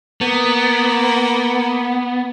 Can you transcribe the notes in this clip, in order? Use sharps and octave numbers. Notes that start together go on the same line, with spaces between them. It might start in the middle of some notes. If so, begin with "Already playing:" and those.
A#3 B3